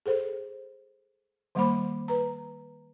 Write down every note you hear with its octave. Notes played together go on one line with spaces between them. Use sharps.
G#4 A4 C5
D#3 G3 A#3 C5 B5 D6
B4 A#5